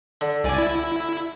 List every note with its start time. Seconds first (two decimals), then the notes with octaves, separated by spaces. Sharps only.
0.21 D3
0.44 C2 D5 G#5
0.58 E4